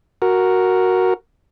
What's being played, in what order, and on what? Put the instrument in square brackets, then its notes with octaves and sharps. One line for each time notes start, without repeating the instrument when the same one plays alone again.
[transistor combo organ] F#4 A#4